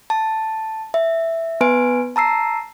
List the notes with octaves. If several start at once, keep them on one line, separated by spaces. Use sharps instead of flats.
A5
E5
B3 B4 G#5 D7
A5 A#5 E6 C7